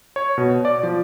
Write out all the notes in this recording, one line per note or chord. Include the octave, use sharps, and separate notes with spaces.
C#5
B2
D5
F3